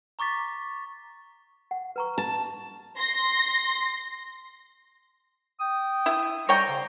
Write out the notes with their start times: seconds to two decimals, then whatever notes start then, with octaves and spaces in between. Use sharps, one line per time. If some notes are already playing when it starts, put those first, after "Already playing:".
0.19 A#5 C#6 D6 A6 B6
1.71 F#5
1.96 B4 A#5 C#6
2.18 A5
2.97 C6 A#6
5.60 G5 D#6
6.06 E4
6.49 G3 C#5 G5 A#5
6.68 C#3 C5